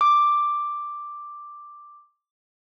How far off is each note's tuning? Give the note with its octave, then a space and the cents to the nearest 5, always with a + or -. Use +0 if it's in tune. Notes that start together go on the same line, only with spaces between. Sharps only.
D6 +5